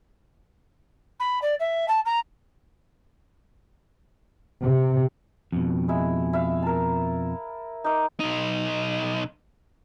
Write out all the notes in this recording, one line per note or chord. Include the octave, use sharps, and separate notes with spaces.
B5
D5
E5
A5
A#5
C3
F2 B2
G#3 E4
E4 E5 F5
A#4 A5
D#4 A#4 D6
B1 D#4